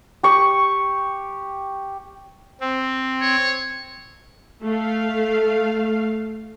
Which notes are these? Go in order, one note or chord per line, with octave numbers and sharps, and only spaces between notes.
G4 C#6
C4
C#5
A3 F5